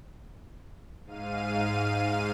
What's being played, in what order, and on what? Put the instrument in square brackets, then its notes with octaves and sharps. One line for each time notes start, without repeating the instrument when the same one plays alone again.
[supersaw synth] G#2 F5 D#7